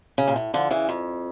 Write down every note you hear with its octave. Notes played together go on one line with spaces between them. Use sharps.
C#3
A#2
A2
D3 F3
C#3 E3
F2